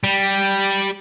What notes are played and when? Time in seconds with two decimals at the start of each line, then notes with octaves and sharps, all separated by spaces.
0.04 G3